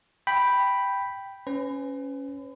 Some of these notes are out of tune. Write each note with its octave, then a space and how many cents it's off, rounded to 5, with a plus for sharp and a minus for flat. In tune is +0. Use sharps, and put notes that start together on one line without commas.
G5 +0 B5 +0
C#4 +0 B4 +35